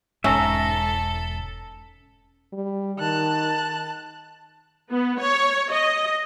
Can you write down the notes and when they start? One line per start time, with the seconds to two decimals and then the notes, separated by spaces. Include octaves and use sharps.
0.24 E1 G#2 C#4 A4 E5 A#5
2.53 G3
2.99 D#3 A5 F#6
4.91 B3
5.20 C#5
5.71 D#5